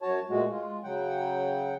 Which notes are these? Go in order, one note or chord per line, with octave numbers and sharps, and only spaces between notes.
F#2 F#4 C#5 A5
A#2 G#3 A3 F#4
G#3 F4
C#3 F#3 F#5 G5